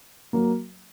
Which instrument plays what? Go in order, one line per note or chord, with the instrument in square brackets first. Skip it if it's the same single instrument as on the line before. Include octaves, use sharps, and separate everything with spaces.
[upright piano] F#3 A#3